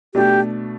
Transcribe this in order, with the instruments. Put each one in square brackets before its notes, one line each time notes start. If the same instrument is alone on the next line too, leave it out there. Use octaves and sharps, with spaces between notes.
[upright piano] B2 A3 D4 [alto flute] G4